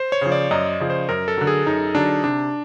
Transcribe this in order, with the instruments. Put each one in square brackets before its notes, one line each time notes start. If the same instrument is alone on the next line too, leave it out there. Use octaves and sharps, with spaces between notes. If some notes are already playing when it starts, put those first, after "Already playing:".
Already playing: [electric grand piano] C5
C#5
[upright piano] C#3 F3
[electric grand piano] D5
[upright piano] F#2 [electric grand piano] D#5
[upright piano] C#3 F3
[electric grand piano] C5
[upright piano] F#2 [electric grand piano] A#4
[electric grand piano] A4
[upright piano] D3 F#3
[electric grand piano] G#4
[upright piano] F#2 [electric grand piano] D#4
[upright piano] D3 F#3 [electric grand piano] D4
[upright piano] C3 [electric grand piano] D4